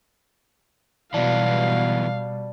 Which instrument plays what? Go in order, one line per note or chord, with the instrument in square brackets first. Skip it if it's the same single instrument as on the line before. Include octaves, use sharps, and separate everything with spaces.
[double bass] B2 G3 [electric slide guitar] E3 F#3 B3 [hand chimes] D5 A5 [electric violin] F5